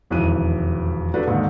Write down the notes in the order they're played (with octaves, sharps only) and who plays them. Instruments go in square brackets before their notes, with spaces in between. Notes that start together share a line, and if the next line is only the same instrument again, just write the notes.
[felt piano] E1 F2 D#3 E4 F#6 D#7
C4 D4 F#4 G4 A4 B4
D#2 G#2 D3 D#3